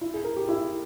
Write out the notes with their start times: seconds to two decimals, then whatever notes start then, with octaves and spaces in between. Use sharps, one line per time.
0.01 E4
0.14 G#4
0.24 A#4
0.37 G4
0.49 E4